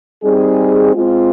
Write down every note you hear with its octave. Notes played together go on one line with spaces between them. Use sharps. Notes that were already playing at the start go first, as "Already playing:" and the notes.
G3 C4 D#4 G#4
G#3 C4 F4